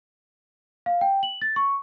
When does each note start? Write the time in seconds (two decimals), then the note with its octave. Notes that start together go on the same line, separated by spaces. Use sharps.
0.86 F5
1.01 G5
1.23 F#7
1.42 A6
1.56 C#6